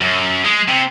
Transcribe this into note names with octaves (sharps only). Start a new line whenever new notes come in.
F#2
G#3
C3